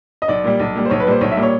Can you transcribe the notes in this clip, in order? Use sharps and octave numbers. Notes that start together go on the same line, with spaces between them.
D#5
B1 D5
A#2 G3
B1
A#2 G3
C5
B1 C#5
B4
A#2 G3 C5
B1 C#5
E5
A#2 G3
C#5